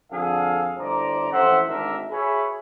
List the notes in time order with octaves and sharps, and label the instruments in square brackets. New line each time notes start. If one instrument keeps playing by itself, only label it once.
[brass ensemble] F2 D3 G#4 A4 F5
G1 A2 C5 D5 A#5
A1 F2 C5 E5 F#5
G#1 D2 D#3 D4 A#4 E5
F#4 G#4 B4 C#5 E5